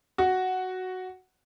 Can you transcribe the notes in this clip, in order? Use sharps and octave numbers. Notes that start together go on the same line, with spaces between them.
F#4